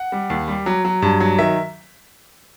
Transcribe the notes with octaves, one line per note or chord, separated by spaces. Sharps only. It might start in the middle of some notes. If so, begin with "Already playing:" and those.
Already playing: F#5
G3
D#2
G3
F#3
F#3
G2
F#3
D#3 E5